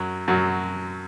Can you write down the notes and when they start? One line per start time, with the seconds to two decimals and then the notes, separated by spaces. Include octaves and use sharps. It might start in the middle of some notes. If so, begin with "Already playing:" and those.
Already playing: F#2 F#3
0.28 F#2 F#3